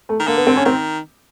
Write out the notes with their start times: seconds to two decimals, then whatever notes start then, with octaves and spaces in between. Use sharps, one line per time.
0.09 A3
0.19 D#3
0.27 D3 A#3
0.37 B3
0.47 C4
0.57 C#4
0.65 D#3 C4